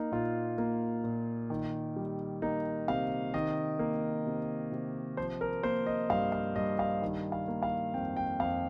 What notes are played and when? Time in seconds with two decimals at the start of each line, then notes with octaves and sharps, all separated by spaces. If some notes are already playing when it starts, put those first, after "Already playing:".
Already playing: A#3 D#4
0.12 A#2 F4
0.58 A#3
1.04 A#2
1.50 D#3
1.96 G3
2.42 A#3 D#4
2.88 C3 F5
3.34 D#3 D#5
3.79 A#3
4.27 C3
4.72 C3
5.17 F3 C5
5.41 A#4
5.63 A#3 C5
5.86 D#5
6.10 G2 F5
6.32 F5
6.55 G2 D#5
6.79 F5
7.02 D#3
7.32 F5
7.48 A#3
7.63 F5
7.94 F2 G5
8.17 G5
8.40 F2 F5